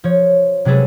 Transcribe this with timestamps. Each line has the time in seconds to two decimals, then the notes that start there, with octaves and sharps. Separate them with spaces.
0.04 F3 C#5
0.65 C3 F#3 G#3 G#4 A4 B4